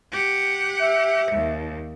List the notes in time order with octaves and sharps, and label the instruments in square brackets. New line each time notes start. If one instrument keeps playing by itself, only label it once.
[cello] G4 F#5
[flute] E5
[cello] D#2